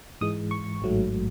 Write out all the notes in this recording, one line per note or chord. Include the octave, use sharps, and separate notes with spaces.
G#2 E3 G#3 D#6
C#6
A1 G#2 F#3 A3